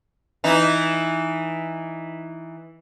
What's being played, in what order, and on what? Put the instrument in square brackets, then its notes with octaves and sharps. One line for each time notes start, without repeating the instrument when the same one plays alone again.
[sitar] E3 D#4